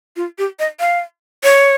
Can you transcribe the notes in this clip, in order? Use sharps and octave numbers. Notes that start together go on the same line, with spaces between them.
F4
G4
D#5
F5
C#5